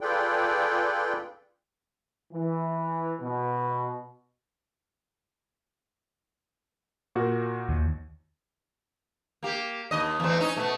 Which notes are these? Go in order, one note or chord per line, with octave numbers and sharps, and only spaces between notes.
F4 G#4 A4 B4 D5 G5
E3
B2
A#2 F#4 A#4
D#2
A#3 G4
D#2 D#5
E2 A3 C4
C#4 D#4
B2 A3